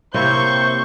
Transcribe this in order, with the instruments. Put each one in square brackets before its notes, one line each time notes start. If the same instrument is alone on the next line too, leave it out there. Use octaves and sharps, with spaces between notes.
[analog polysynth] C3 [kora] A#3 E4 C#5 [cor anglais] C5 [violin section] C#6 G6